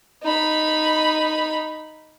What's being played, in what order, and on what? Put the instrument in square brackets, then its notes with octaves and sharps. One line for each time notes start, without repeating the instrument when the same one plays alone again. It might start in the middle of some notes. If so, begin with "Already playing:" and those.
[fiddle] D#4 B5